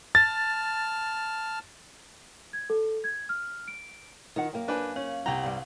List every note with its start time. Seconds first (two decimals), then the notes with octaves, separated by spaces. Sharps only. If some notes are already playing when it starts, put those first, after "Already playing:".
0.15 A5 F6 A6
2.53 G#6
2.70 A4
3.04 G#6
3.29 F6
3.68 D7
4.36 D#3 D#4 F4 F#5
4.53 F#2 A#3 G5
4.68 D4 B4 C5 G#5
4.96 C#4 F5
5.26 C2 G4 F5 F#5 A#5
5.43 G2 G3